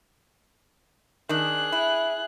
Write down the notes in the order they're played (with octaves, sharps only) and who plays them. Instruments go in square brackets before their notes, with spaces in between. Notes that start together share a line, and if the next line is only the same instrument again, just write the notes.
[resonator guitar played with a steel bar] D#3 D4 [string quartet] G#4 F#6
[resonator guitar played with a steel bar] E4